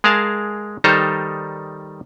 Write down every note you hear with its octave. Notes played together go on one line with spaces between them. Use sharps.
G#3 G#4 A#4 F5 A5
D#3 G3 D#4 A4 C5 A#5